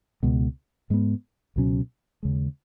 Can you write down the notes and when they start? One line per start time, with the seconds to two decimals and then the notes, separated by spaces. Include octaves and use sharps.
0.23 C#2 B2 G#3
0.90 G#2 G#3 B3
1.56 C#2 B2 F#3 C#4
2.23 D#2 C#3 G#3